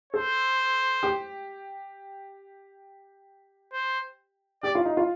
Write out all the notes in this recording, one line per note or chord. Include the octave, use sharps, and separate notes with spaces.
A4 C5
G4
C5
G4 D5
F4
D#4
F4